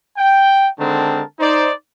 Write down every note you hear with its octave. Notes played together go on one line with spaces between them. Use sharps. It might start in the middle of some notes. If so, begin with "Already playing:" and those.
G5
D3 D#3 G#3 C4 A#4 A5
D#4 C5 D5